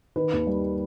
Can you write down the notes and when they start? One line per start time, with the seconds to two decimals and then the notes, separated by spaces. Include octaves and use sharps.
0.16 D#3 B4
0.33 D#2
0.47 G3